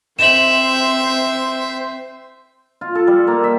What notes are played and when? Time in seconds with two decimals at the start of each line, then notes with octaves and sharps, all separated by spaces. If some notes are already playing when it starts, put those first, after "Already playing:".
0.19 C4 C5 E5 E7 F#7
2.81 F4
2.95 A4
3.07 G3
3.27 A#3
3.44 E5